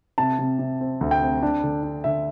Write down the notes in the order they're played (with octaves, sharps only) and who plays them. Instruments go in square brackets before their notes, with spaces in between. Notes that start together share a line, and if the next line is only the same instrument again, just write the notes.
[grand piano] C3 A5
C3
C3
C4
D2
G5
C4
D4
D3
D4
D3 E5